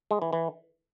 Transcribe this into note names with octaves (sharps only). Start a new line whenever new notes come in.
G#3
E3
E3